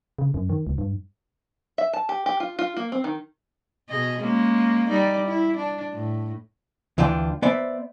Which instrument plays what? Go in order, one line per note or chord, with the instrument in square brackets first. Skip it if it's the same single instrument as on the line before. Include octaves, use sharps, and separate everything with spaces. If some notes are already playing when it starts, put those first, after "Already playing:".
[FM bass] C#3
F#2
D#3
C#2
G2
[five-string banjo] E5
A5
G4
G4
F4
F4
A#3
C4
D#3
[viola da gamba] B2 G#4 D#5
G#3 A#3 C#4
G3 D#4 D5
E4
D4
A2
[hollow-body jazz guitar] D2 E3 D4 F4 G5
B3 C5 D5 E5